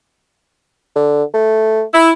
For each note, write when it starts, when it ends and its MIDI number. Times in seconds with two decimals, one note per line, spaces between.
0.96 1.24 50
1.34 1.83 57
1.94 2.12 64